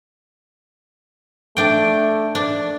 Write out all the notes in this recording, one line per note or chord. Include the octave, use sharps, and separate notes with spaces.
A3 D4 G5
D4